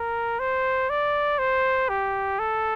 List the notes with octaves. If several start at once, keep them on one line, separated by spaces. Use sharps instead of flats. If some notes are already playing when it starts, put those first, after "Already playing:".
Already playing: A#4
C5
D5
C5
G4
A4